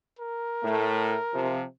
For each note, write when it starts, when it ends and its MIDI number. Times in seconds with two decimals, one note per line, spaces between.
0.19 1.55 70
0.64 1.17 45
0.64 1.17 57
1.33 1.62 48
1.33 1.62 53